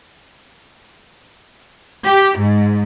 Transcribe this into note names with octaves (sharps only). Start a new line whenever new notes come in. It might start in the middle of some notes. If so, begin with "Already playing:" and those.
G4
G#2